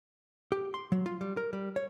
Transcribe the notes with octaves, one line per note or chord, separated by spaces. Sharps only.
G4
C6
F#3
F4
G3
A#4
G3
C#5